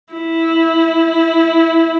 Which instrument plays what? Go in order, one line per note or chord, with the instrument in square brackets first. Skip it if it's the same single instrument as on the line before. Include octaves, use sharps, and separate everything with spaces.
[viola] E4